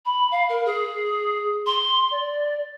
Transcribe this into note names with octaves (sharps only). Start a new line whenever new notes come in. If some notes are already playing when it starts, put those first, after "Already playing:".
B5
F5
A#4
G#4
C6
D5